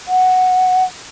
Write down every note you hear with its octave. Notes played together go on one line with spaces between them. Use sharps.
F#5